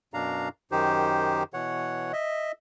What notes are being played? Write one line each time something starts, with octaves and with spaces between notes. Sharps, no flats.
F#2 B2 D4 F5 A#5
F#2 D#3 D#4 G4 C5
B2 E3 C#5 F#5
D#5 E5